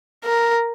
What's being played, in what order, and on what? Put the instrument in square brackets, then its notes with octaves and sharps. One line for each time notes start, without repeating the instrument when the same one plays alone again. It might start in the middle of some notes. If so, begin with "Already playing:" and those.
[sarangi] A#4